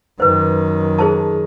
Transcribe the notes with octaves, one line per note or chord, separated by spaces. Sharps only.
F#2 D#3 B4 C5
G#4 C5 A5